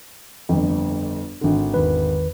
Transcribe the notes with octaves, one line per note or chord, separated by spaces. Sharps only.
G1 F2
G#1 D3
E2 D#3 B4